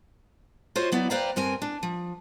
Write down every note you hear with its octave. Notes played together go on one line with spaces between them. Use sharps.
F4 F#4 C5 C#5 D#5
F#3 B3 E4 D5
B4 C5 D5 F5 G5 A#5
G2 C4 A#4 G#5
D4
F3